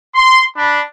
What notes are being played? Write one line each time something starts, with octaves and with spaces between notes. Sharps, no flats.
C6
D4 B5